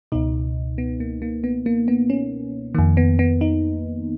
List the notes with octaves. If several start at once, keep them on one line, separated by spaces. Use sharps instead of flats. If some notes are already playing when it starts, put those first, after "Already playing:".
C#2 B2 D#4
B3
A#3
A#3
B3
A#3
B3
C#4
F2 D#3 A#3
B3
B3
D#4